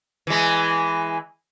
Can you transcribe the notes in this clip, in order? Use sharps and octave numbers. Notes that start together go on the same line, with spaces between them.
E3 G#3